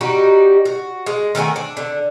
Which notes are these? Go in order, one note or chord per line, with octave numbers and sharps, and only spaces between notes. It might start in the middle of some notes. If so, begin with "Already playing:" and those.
G3 D#4 F#4 G4
F#4
G#3
D#3 A3 F#4 G#5
D4
D3